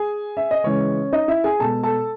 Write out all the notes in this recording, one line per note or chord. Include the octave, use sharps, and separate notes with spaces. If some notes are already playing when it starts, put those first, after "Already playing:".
Already playing: G#4 G#5
E5
D#5
C#3 E3 G#3 C#4 C#5
D#4 D#5
E4 E5
G#4 G#5
B2 G#3 A4 A5
A4 A5